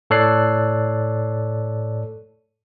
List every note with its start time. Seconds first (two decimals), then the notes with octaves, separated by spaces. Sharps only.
0.10 A2 A4 C#5 D5 F#6 C7